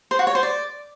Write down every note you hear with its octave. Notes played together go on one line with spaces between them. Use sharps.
C5
F#4
C#5
C5
D5